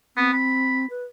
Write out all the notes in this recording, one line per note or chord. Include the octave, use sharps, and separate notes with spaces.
B3 C4
B5
B4